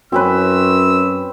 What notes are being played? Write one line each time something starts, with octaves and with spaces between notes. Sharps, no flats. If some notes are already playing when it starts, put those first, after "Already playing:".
F#2 C4 C#4 B4 E6